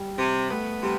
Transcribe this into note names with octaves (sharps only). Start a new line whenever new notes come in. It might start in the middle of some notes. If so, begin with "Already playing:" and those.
Already playing: G3
C3
A3 B3
C3 G3